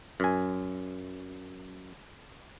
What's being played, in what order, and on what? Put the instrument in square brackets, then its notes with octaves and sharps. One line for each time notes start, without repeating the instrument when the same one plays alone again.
[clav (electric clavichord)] F#2 G#5